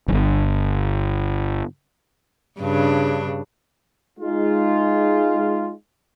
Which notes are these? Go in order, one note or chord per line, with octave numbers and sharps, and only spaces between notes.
D1 G1
G2 C#3 D4
G#3 D#4 F4